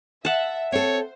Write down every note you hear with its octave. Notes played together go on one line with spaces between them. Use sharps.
E5 F#5 A5
C4 A4 C5 C#5